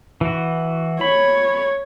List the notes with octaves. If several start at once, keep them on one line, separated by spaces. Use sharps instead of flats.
E3 F#4
C#5 B5